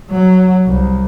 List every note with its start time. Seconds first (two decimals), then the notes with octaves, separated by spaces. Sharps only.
0.10 F#3
0.67 C2